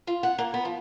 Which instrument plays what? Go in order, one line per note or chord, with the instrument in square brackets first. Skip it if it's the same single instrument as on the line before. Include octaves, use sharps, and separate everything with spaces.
[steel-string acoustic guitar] F4
F#5
A#3
B3
F3